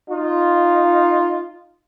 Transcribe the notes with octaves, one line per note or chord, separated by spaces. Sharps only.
D#4 F4